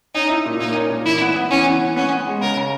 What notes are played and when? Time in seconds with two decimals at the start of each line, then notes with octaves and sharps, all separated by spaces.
0.15 C#4 D#4
0.29 E4
0.45 A#2
0.60 A#3 D#4
0.74 C#4
0.90 A#2
1.05 E3 E4
1.21 B3
1.36 B3
1.50 E3 C#4
1.66 E3
1.81 B3
1.96 B3 C#4
2.11 B3
2.27 G#3
2.41 C#3 A#4
2.57 C#3